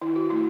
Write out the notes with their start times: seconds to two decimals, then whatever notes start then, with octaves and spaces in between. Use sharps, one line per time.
0.02 D#3 E4
0.16 F#4
0.30 A3 E4